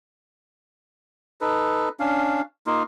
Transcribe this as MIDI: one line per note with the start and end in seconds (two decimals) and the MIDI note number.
1.41 1.89 63
1.41 1.89 69
1.41 1.89 71
2.00 2.41 61
2.00 2.41 62
2.00 2.41 77
2.66 2.83 58
2.66 2.83 63
2.66 2.83 65